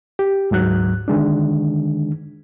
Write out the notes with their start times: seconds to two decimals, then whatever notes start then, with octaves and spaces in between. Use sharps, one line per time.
0.19 G4
0.51 D2 G#2 F#3 F#6
1.08 D3 D#3 G#3 D4